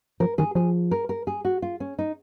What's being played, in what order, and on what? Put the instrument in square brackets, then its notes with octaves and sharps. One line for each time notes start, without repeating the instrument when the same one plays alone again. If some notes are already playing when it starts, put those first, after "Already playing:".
[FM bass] F3 [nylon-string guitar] A#4
[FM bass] D#3 [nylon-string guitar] G#4
[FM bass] F3 [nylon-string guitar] G#4
[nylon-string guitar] A#4
A#4
G#4
F#4
F4
C#4
D#4